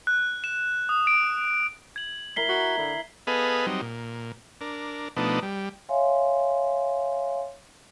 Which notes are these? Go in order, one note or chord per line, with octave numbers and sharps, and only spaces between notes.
F#6
E7
D#6
D7
G#6 F#7
E4 A#4 A#5 B6 C7 G7
F#4 B6
D3 E4
B3 G#4 A4 B4 D#5 F5
F#3 G3 C4 D#4
A#2
D4 A#4
B2 F3 A3 B3 D4 D#4
G3
C#5 E5 F5 G#5 C6